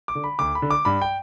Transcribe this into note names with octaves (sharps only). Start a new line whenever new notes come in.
D6
D3
B5
D2 D6
B5
D3
D6
G2 B5
G5